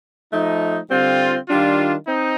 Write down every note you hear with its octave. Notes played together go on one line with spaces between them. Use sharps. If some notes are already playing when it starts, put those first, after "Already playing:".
F3 A3 D#4
D3 G3 C4 F4
D#3 G3 D4 F4
C4 D#4